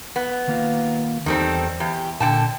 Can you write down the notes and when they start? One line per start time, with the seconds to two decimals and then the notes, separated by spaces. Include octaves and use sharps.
0.16 B3
0.48 D#3 A#3 F4
1.26 E2 D#3 G3 C4 A4
1.80 E2 G4
2.20 A#2 D3 A4 G5 A5